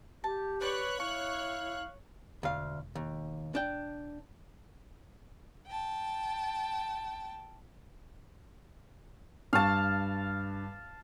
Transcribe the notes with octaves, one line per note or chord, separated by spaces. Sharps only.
G4 A5
B4 C#5 D5 F#6
E4 F5 C#6
E1 D2 F5
D#2
D4 G5
G5 A5
G2 F5 A5 C#6